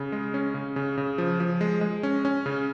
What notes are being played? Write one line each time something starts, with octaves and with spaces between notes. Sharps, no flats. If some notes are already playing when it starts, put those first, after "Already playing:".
Already playing: C#3
G#3
C#4
C#3
C#3
C#3
F3
F3
G#3
G#3
C#4
C#4
C#3